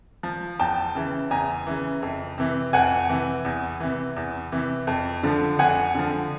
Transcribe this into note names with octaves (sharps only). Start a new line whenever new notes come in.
F3
E2 G5 A5
C#3 E3
E2 G#5 A#5
C#3 E3
F2
C3 E3
F2 F#5 G#5
C3 E3
E2
C3 E3
E2
C3 E3
F2
D3 F3
F2 F#5 G#5
D3 F3